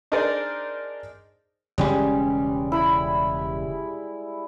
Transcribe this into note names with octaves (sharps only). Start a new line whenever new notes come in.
D4 D#4 G#4 A#4 C5 D5
E1 C#3 G3 G#3 C#4
E4 B5